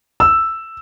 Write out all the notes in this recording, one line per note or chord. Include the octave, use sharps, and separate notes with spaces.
E6